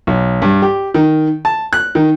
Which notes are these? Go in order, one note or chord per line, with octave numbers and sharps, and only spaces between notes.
B1
G2
G4
D#3
A5
F#6
D#3